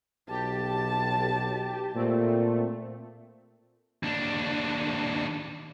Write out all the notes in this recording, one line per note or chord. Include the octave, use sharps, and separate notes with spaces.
B1 G4 A5
A#2 A3 C4
D#2 D4